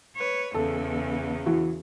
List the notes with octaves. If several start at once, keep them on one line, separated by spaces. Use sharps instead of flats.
B4 C#5
E2 C#3 A4
E3 F#4